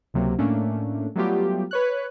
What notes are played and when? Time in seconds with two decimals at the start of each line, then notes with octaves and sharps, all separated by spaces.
0.14 C#2 C3 F#3 A#3
0.38 A2 A3 A#3 C#4 D4
1.16 F#3 G3 A3 B3 F4 G4
1.71 B4 C#5 F#6